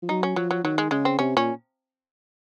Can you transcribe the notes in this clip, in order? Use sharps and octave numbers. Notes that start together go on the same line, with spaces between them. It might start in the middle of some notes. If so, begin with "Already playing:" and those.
F3
F#3 D#4
C#4
F3 F#3
F#3
D#3 F#3
G#3
C#3 G#3
C4
C3 C#4
A#2 C#4